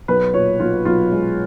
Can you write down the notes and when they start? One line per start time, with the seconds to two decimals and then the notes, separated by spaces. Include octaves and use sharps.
0.08 B1 B4
0.34 A#2 C#5
0.60 B1 F4
0.85 B1 F4
1.12 G#3